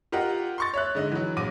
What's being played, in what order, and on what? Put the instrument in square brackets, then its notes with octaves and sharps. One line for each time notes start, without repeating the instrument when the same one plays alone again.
[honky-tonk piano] F4 G4 A#4 D#5 F#5
C6 C#6 A6
C#5 E5 F#6
G#2 D3 D#5
E3 F#3
A#1 F#3 D6 D#7